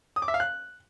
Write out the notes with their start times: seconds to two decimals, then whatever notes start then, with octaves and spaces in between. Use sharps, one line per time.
0.16 D#6
0.22 D6
0.28 E5
0.34 F5
0.40 F#6